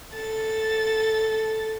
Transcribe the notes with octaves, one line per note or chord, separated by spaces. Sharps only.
A4 A6